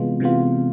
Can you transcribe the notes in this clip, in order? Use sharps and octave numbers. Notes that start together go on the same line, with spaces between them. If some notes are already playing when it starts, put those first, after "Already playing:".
Already playing: C3 E3 G#3 B3 F4
C3 E3 G#3 B3 F4